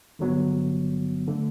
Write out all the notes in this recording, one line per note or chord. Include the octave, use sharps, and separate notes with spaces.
G1 G2 D3 F#3 B3
D3 A3